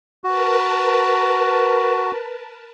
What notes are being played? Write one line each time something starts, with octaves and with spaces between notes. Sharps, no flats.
F#4 A#4 B4 A5